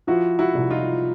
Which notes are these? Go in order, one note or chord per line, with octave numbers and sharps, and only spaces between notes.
F3 E4 F#4
E4 F#4
C2
D#4 F4